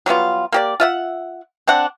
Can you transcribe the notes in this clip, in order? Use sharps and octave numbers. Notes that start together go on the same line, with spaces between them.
F#3 G3 B3 F4
A#3 G4 D5
F4 E5 F#5
C4 D4 F#5